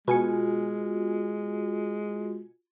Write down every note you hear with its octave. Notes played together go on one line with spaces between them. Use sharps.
B2 G#3 F4 F#4 G#5 C#7